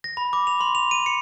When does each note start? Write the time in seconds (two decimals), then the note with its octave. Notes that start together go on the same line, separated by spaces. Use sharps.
0.04 A#6
0.17 B5
0.33 D6
0.47 F7
0.61 C6
0.75 F7
0.91 D#7
1.06 C#7